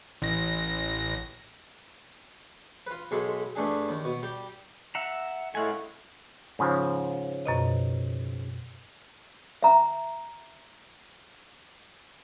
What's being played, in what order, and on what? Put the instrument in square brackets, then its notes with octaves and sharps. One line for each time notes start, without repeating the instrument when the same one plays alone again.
[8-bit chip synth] A1 A#6
[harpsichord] F4 B4
B1 G#3 G#4 A4 B5 C6
G2 A3 D4 G#4
D#2
B2
G3 G4
[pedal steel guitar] E5 F#5 A#5
[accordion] A2 G#3 A3 [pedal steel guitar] F5 F#5 G#5
[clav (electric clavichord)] G#2 C#3 F3
[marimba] F#2 B2 D#5
[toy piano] E5 A#5